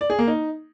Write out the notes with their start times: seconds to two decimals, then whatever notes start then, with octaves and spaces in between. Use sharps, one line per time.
0.01 D5
0.10 G#4
0.19 A#3
0.28 D#4